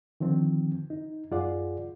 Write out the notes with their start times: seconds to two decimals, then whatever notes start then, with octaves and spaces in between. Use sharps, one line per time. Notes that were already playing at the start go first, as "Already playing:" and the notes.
0.20 D3 D#3 F3 C4
0.90 D#4
1.31 F#2 F4 G#4 D5 F#5